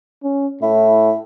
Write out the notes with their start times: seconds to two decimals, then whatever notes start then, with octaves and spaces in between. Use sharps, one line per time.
0.23 C#4
0.62 A2 E4